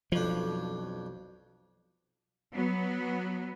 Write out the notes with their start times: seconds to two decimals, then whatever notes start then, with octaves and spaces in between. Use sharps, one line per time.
0.12 B1 F2 F3 D4
2.54 F#3 B3